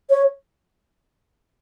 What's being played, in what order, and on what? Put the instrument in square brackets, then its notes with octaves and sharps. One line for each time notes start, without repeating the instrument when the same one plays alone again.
[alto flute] C#5